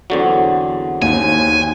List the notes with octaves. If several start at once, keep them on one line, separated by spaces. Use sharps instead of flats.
E2 D3 F#3 C4 F#4
D#2 G#5